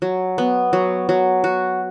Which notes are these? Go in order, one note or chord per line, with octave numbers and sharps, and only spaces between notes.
F#3
B3
F#3
F#3
F#4